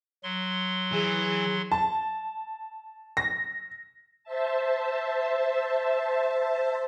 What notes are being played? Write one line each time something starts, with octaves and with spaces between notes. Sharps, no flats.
F#3 C6
E3 G#4
A5
A#6
C5 E5 A5